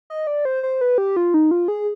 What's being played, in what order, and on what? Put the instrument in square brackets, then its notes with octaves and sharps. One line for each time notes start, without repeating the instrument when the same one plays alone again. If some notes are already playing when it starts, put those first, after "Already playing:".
[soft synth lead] D#5
D5
C5
C5
B4
G4
F4
D#4
F4
G#4